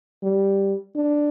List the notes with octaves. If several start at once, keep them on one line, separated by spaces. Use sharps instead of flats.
G3
D4